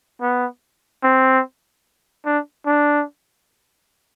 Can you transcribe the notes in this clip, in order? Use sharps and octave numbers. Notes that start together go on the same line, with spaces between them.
B3
C4
D4
D4